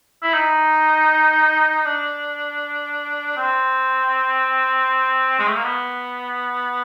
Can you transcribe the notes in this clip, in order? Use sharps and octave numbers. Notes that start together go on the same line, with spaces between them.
E4
D#4
D4
C4
G#3
A3
A#3
B3